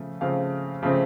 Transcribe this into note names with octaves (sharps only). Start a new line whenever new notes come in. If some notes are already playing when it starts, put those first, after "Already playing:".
Already playing: C#3 F3 A3
C#3 F3 A3 C4 F5
C#3 F3 A3 C4